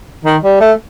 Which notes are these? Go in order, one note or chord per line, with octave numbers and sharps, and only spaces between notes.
D#3
G3
A3